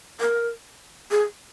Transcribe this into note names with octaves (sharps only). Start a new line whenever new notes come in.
A#4
G#4